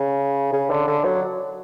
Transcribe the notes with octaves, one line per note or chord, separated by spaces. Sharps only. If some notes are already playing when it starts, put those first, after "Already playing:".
Already playing: C#3
C#3
D3
D3
F#3